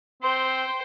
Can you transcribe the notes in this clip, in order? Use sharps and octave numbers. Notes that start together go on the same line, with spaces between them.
C4 C5 G5 C6